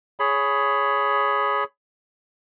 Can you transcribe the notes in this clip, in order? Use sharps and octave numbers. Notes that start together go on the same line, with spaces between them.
G#4 C#5 B5